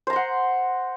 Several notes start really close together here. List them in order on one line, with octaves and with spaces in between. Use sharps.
C5 A#5 C6 F#5